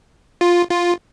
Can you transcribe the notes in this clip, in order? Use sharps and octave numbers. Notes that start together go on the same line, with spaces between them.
F4
F4